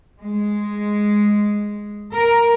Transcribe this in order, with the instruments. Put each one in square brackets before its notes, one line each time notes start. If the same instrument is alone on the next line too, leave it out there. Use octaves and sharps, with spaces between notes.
[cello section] G#3
A#4